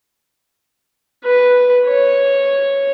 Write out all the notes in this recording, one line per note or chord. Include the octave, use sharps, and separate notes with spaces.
B4
C#5